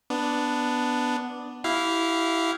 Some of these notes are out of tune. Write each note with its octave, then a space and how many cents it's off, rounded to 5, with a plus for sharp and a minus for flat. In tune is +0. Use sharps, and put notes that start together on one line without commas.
B3 +0 D4 +0
E4 +0 G4 -30 F5 +0